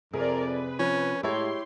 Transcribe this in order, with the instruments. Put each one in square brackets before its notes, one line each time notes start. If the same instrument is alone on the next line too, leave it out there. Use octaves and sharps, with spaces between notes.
[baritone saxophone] F2 [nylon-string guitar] C3 [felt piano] G#4 [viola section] A#4 D5
[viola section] B4
[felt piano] F3 [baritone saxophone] C#4
[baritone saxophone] A2 [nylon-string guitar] G#3 [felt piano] E4 C#5 [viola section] G4 C6